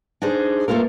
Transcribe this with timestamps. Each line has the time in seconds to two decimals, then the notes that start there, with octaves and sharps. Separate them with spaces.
0.22 D4 D#4 G#4 C5
0.68 A3 A#3 F4 A4 A#4